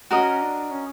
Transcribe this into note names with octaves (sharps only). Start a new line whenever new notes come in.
C#4 F#4 A#4 D#5
D4
C#4